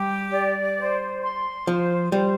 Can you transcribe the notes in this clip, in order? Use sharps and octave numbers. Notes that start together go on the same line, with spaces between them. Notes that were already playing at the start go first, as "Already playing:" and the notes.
Already playing: G3 G4
D5
C5
C6
F3 C5
G3 C5